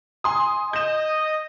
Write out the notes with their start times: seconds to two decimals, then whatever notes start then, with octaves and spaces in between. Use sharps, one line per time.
0.24 G#5 C6 D#6
0.73 D#5 G6 E7